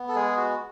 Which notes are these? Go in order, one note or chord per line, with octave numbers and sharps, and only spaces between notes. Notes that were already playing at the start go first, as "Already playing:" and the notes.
Already playing: B3
A4
G#3 G#4
F#4